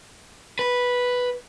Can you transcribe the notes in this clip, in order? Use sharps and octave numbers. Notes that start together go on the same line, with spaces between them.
B4